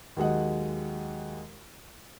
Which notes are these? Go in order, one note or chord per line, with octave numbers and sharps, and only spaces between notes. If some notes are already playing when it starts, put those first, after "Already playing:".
D#2 F#3 G#3 D#5 F#5